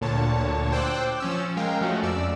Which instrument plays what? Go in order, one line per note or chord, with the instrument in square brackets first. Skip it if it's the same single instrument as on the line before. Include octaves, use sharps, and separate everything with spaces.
[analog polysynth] D2 A#2 D3 C#5 A5
C5 G5 D6 E6 F#6
F3 C#4 E6
G#3 A#4 F5 G5
F3 A3 C#4 F#4
F2 D5 E6